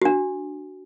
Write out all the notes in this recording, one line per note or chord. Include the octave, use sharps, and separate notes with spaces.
D4 F#4